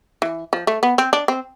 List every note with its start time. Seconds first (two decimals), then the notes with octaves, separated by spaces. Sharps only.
0.22 E3
0.53 F3
0.67 A3
0.83 B3
0.98 C4
1.13 D4
1.28 C4